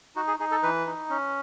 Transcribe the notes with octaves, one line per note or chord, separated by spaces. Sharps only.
D#4 F#4
G#4
D#4 G#4
A4
E3 B4
D#4
C#4